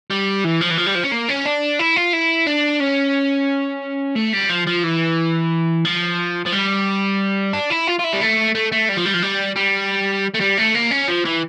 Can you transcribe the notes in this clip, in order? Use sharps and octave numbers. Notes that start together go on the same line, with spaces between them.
G3
E3
F3
E3
F3
G3
F3
C#4
A#3
C#4
D4
E4
F4
E4
D4
C#4
A3
G3
F3
F3
E3
F3
F3
G3
D4
E4
F4
F4
E4
G3
A3
A3
A3
G3
F3
G3
F3
G3
G3
A3
G3
A3
A#3
C#4
F3
E3